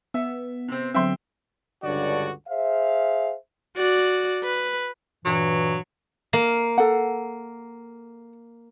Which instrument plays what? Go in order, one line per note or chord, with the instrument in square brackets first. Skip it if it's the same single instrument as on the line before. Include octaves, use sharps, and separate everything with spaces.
[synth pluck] B3 [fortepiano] E5
[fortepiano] C3 C4
[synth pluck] D3 F#3 C4 [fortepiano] E5 G5 C6
[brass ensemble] C#2 G2 D3 F#4 C#5 D5
G#4 C5 E5 F5
[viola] F#4 D5
B4
[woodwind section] G2 A#2 E3 [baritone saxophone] F#3
[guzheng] A#3
[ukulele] A4 F#5